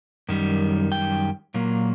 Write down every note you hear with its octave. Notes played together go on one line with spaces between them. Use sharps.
F#2 D#3 G3
G5
A#2 F#3 A#3